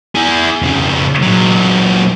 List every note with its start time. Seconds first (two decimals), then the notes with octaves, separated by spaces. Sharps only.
0.15 E4 G#4
0.62 F2 C#3
1.22 A#2 F#3